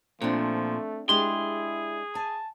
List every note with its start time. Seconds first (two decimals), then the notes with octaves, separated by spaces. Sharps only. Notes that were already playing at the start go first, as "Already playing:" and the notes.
0.22 A#2 F3 A3 C4 D4
1.09 G#3 D4 E4 G4 G#4 C6
2.15 G#5 A5